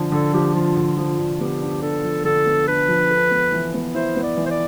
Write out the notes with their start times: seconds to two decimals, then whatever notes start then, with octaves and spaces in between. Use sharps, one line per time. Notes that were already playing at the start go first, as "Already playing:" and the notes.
Already playing: D3 F3
0.12 D3 A4
0.34 F3 G4
0.54 F3 F4
0.77 D3
0.97 F3 F4
1.19 D3
1.40 B3 G4
1.61 D4
1.82 D4 A4
2.04 F3
2.25 D3 A4
2.46 B3
2.67 D4 B4
2.88 F3
3.10 A4
3.31 B3
3.52 E3
3.74 B3
3.94 E4 C5
4.16 B3
4.23 D5
4.37 E3
4.46 C5
4.51 D5